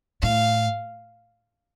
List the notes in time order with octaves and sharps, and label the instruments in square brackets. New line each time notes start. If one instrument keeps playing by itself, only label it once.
[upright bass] A2 [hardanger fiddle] F5